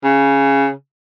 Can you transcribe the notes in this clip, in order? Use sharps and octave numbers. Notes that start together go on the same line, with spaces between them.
C#3